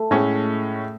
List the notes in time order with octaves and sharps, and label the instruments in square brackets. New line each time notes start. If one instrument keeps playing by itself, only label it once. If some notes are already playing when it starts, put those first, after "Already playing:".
Already playing: [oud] A3
[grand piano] A2 G#3 C#4